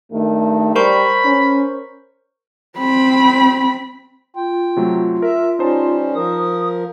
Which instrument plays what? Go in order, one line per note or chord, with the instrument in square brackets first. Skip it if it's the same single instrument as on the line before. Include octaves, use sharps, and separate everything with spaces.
[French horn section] G2 D#3 A3
[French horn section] G3 [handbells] A#4 C5 C#6 [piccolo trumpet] B5
[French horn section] C#4
[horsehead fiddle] C4 B5
[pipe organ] F4 [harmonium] G5
[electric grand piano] C3 F#3 A3
[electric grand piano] A#4 [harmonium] E5
[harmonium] G3 C#4 [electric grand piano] D#4 C5 A5
[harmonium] F3 A#4 [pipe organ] D#6